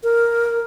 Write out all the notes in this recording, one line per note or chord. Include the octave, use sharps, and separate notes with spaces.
A#4